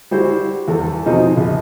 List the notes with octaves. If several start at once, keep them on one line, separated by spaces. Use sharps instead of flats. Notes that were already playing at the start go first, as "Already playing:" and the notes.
G3 E4 F#4 C5
E2 A4
B2 F3 C4 D#4
A#1